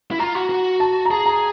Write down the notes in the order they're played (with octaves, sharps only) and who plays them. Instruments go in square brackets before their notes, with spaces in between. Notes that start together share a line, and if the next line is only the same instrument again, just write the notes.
[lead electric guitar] E4
[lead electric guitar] F4 [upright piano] A#5
[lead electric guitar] F#4
F#4
[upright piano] A5
A#5
[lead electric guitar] G#4 [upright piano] A5
[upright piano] A#5